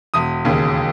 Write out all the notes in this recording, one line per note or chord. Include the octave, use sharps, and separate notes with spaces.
E1 D#6
D#2 C#3